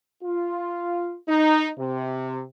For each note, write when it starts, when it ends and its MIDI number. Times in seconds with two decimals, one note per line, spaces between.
0.24 1.16 65
1.29 1.69 63
1.79 2.43 48